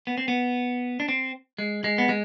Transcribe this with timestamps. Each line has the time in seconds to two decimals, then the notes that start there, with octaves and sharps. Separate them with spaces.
0.07 B3
0.18 C4
0.28 B3
1.00 D4
1.09 C4
1.58 G#3
1.84 G#3
1.98 B3
2.09 G#3